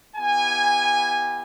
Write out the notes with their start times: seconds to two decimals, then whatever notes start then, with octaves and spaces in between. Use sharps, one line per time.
0.17 B3 E4 G4 G#5